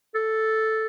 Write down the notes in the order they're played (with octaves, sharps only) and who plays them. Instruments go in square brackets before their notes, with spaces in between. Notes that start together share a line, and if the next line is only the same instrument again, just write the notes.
[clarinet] A4